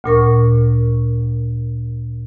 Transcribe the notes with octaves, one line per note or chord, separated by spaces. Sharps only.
D2 A#2 A#4 C#6